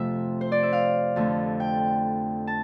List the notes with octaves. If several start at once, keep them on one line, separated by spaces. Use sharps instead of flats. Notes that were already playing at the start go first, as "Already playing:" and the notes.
Already playing: F2 C3 F3 A3 E5
C5
D5
E5
F5
F2 D3 A3
G5
A5